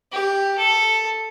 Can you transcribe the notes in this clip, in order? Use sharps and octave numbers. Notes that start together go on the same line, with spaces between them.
G4
A4